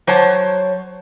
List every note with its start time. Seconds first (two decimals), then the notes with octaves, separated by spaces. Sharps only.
0.07 F#3 C5 C#5 A5